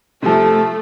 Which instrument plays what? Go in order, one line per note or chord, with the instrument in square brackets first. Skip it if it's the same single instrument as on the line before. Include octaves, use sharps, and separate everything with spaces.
[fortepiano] C3 F3 [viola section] A3